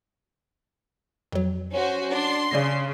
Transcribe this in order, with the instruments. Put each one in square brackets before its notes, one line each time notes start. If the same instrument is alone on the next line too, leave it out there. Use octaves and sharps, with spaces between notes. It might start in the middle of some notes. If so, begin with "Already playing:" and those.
[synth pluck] F2 F#3
[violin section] C#4 F#4 C5
[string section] D4 [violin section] C6
[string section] C#3 [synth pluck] D5 A#6